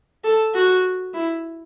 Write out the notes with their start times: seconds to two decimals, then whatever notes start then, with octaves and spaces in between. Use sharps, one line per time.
0.24 A4
0.54 F#4
1.13 E4